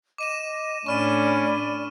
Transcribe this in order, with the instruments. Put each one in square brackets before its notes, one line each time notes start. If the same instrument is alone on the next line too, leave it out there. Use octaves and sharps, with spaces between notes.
[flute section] D#5 [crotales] D6 D#7 E7
[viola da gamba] A2 D4 [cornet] C#4 [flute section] D5 B5 [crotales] C#6 F6 D#7